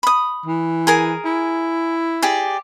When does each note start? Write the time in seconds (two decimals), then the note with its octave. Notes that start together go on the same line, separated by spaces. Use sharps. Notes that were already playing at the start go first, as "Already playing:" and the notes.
0.03 B5 D#6
0.46 E3
0.87 G#4 A#4 G#5
1.25 E4
2.22 G4 G#4 D5